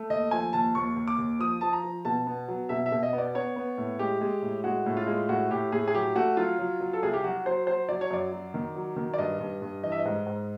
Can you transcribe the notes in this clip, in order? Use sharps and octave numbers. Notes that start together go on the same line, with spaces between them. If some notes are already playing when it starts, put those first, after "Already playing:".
Already playing: A3
D#2 D#5
F3 G#5
D#2 A5
D#2 C#6
D#2
D6
D#2
F3 D#6
F3 A5
A#5
F3
B2 A5
B3
F#3
B2 E5
E5
B2
D#5
B3
D5
B3 C#5
B3
A2
G#3 G4
G#3
A2
G#3 F#4
A2
F4
G#3
A2 F#4
A2 G4
A2 G#4
G#4
F#3 G4
A3 F#4
F#3 F4
F#3
F#3
A4
C2 G#4
G4
F#3 F#4
F#3 C5
F#3 C5
F#3 D5
C#5
F#2 D5
F#3
D#3
F#3
D#3
D5
G2 D#5
G2
G2
E3 D#5
E5
D#5
G#2
G#2